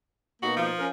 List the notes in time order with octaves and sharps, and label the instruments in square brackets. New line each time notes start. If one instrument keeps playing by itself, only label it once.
[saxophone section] B2 A#3 D#4 [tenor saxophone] F#4
[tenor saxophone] F3
[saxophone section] C#4 A#4